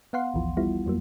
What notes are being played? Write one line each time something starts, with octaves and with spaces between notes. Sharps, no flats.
B3 F5 F#5 C6
A1 D#2 E3 F3
G3 B3 E4 F4
F2 F#3 A#3